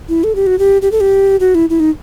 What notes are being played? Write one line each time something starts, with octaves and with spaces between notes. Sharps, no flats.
E4
A4
G4
F#4
G4
G4
A4
G4
F#4
E4
E4
D#4